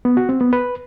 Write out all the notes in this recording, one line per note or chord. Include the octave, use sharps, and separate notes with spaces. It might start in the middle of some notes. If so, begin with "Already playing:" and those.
B3
F#4
C4
B3
B4